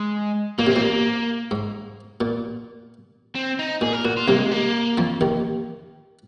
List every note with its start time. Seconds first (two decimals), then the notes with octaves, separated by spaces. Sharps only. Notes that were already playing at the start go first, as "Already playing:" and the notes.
Already playing: G#3
0.59 A#2 A#3
0.67 C3
0.71 C4
0.76 A#2
0.82 A#3
1.51 G#2
2.21 A#2
3.35 C4
3.59 D#4
3.81 A#2 G#4
3.93 A#4
4.04 A#2 F#4
4.17 F4
4.28 C2 C3 A#3
4.39 G#3
4.51 A#3
4.98 F2 F3
5.21 D#2 D#3